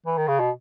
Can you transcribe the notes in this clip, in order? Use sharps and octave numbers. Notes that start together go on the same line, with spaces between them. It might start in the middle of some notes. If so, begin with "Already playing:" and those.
E3
D#3
C#3
B2